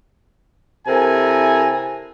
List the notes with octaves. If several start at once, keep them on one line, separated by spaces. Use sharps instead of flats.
C3 E4 A4 A#4 G#5